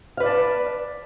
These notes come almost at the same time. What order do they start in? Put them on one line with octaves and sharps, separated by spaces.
F5 B4 D5 A5